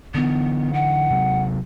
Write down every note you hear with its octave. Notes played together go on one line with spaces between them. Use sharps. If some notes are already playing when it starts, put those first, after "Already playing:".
D3 E3 B3
F#5
C3 F#3